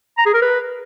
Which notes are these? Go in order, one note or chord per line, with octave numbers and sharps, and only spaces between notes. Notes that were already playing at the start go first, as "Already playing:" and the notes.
A#5
G#4
A#4
B4